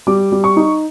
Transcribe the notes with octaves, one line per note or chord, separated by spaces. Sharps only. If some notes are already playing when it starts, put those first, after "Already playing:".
G3 D6
G3
C#6
D#4